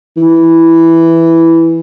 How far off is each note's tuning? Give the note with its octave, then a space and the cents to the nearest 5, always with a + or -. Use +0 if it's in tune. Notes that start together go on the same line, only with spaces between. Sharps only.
E3 +0